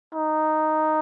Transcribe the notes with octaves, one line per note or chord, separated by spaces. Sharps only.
D#4